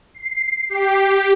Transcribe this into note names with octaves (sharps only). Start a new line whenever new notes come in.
C7
G4